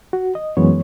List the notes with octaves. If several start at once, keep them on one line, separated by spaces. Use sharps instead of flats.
F#4
D#5
F#2 E3 G#3 B3 C#5